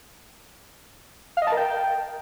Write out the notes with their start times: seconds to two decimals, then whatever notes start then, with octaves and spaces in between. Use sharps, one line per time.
1.37 F5
1.42 D#5
1.47 A5
1.52 A#4
1.57 G5